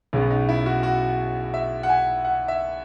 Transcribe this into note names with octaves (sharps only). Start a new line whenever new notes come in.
B1 B2 G#3 B3 C#4
D#4
E4
F#4
F#4
E5
F#5
G#5
F#5
E5